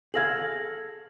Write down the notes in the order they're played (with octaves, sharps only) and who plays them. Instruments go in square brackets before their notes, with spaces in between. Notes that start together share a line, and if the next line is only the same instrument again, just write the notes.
[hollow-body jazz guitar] G#4 A4 F5 [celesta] G#6 A#6 F#7